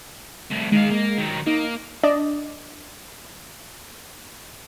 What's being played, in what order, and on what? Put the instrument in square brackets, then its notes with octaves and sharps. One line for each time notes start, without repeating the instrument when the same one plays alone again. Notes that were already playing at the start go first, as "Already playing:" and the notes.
[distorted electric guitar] C2 A2
[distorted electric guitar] D#3 F5 [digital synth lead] G#3
[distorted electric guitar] A#3
D#3 F#3
[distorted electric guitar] A#3 [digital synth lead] D#4
[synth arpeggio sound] D4 D5 D#5